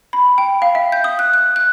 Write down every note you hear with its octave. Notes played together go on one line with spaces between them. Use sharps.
B5
G5
F5
E5
G6
D#6
F#6
F#6
F#6